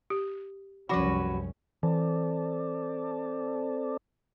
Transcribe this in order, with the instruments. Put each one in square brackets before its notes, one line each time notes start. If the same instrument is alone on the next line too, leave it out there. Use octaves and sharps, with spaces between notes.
[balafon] G4
[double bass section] C2 F#2 C#4 [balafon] F3 B5 [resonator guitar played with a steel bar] F#4 B4
[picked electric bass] E3 [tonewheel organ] C4 A4 D5